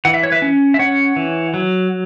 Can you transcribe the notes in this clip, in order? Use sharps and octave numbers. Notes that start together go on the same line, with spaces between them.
E3 F#5
E5
C#5
B4 E5
C#4
E5
C#4 C#5 F#5
E3
F#3